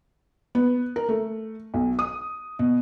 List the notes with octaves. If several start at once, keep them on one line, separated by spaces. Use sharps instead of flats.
B3
A#4
A3
B1
D#6
B2